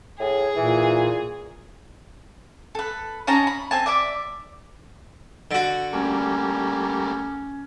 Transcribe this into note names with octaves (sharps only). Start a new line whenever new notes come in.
A2 G#4
A#2 E3
A4 B4
C#4 D#4 A5 A#5
B5
C4 G#5 A5
D5 E5 B5 D6
D3 F#4
G3 A3 A#3 C#4